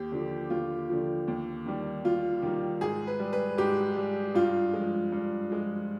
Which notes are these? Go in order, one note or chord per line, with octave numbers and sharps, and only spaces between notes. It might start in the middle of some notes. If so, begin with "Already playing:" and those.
Already playing: D#2 G4
D3 F3
D#2 F4
D3 F3
D#2
D#3 G3
D#2 F4
D#3 G3
G#2 G#4
B4
G3
B4
G#2 G4
G3
G2 F4
F3 G#3
G2
F3 G#3